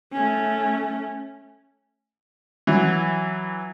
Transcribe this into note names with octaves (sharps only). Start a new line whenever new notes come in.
A3 C#4
E3 F#3